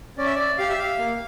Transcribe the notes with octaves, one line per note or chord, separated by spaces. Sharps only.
C#4 D5
E5
D5
G4 F5
E5
F5
A#3